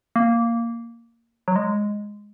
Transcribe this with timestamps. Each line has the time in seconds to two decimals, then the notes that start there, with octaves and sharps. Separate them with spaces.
0.16 A#3
1.48 F#3
1.56 G#3